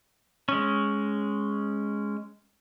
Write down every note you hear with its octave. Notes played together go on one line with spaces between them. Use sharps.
G#3 C#4